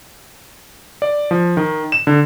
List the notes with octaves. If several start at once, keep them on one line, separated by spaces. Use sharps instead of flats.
D5
F3
D#3
E7
D3